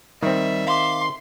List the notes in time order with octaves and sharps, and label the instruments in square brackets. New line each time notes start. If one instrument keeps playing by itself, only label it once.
[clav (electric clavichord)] D#3 C4 [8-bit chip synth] G3 [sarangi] E5
[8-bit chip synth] F5 D6 [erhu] C6